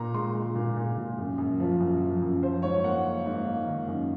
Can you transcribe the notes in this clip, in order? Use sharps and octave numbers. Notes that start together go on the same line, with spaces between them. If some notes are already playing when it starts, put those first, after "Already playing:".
Already playing: A#2 A#5
G#3 C6
G#3
A#2
A#2
A#2
F#2
F#2
F3
F#2
F3
F#2
F3 C5
G#2 C#5
A#3 F#5
A#3
G#2
A#3
D#3
F#2